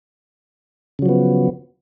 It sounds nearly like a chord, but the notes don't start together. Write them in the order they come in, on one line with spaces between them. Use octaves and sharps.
C#3 F#3 F3 B3